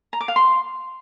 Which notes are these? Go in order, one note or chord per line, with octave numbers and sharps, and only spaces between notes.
A#5
D6
F5
C6